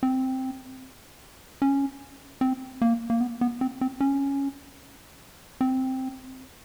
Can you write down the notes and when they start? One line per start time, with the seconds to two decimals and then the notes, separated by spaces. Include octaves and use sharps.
0.03 C4
1.62 C#4
2.41 C4
2.82 A#3
3.10 A#3
3.21 B3
3.41 B3
3.61 C4
3.81 C4
4.00 C#4
5.61 C4